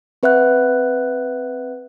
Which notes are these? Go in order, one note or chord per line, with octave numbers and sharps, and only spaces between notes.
C4 B4 E5 F#5 F#6